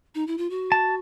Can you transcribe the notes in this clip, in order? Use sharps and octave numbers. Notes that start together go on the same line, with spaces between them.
D#4
E4
F4
F#4
A5